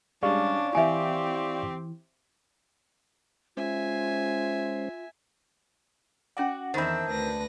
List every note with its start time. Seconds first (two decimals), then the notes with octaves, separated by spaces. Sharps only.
0.23 G3 G#3 C#4 D4 D5 F5 C#6
0.75 E3 C4 E4 G4 E5 G#5
3.57 G#3 C#4 F4 C5 E5 G#5
6.37 C#4 F#4 D5 F#5
6.74 E2 D#3 C4 D4 C5 E5 A5 B5
7.09 D2 B4 A#6